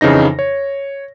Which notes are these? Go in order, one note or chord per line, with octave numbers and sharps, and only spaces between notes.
F2 C#3 E3 D#4 A#6
C#5